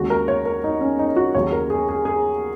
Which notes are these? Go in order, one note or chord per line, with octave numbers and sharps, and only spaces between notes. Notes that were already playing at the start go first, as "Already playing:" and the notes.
Already playing: D#2 C#3 G#3 F#4
A#4
C#5
A#4
D#4
C#4
D#4
F#4
D#2 C#3 F#3 C#5
A#4
G#4
G#4
G#4